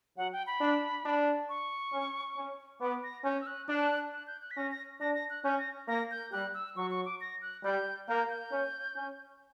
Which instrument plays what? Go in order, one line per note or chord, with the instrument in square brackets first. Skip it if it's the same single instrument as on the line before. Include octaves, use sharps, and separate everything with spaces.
[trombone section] F#3 [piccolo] F#5
[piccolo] G5
B5
[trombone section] D4
D4
[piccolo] C#6
[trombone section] C#4
C#4
[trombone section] B3 [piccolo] D6
[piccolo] A#6
[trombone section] C#4 [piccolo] G6
[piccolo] E6
F#6
[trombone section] D4 [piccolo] F#6
[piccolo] F#6
G6
F#6
B6
[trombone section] C#4 [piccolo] A#6
[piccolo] A#6
[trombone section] D4 [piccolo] A#6
[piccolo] A#6
F#6
[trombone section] C#4 [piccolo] G6
[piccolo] A#6
[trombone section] A#3 [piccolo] A#6
[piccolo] G6
[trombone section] G3 [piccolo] F#6
[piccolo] E6
[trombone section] F#3 [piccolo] C#6
[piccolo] C#6
D6
A#6
F#6
[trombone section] G3 [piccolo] G6
[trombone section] A#3 [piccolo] G6
[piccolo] G6
[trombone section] C#4
C#4